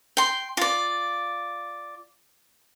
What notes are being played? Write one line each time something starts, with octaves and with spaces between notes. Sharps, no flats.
G5 C6
F4 D5